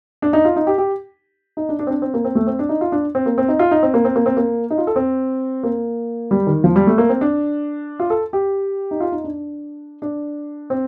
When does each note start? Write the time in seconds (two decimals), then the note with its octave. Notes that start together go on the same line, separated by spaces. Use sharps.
0.22 D4
0.33 D#4
0.45 F4
0.56 D#4
0.67 G4
0.78 G4
1.57 D#4
1.69 D4
1.79 D4
1.87 C4
1.90 D4
2.02 C4
2.14 A#3
2.25 C4
2.35 A3
2.47 C4
2.59 D4
2.69 D#4
2.81 F4
2.92 D4
3.15 C4
3.26 A#3
3.38 C4
3.48 D#4
3.59 F4
3.71 D#4
3.83 C4
3.94 A#3
4.05 C4
4.16 A#3
4.26 C4
4.37 A#3
4.70 D#4
4.78 F4
4.87 A4
4.96 C4
5.63 A#3
6.31 G3
6.47 D#3
6.64 F3
6.76 G3
6.87 A3
6.98 A#3
7.09 C4
7.21 D4
8.00 F4
8.10 A4
8.33 G4
8.91 D#4
9.00 F4
9.12 D#4
9.24 D4
10.02 D4
10.70 C4